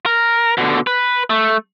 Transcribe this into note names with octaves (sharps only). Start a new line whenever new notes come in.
A#4
B2 D3
B4
A3